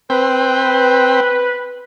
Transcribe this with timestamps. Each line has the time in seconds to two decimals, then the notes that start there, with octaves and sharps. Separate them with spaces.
0.10 C4 B4 G5